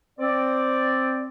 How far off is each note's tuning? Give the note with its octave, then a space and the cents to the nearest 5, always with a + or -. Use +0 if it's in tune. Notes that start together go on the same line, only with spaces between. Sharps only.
C4 +0 D5 +0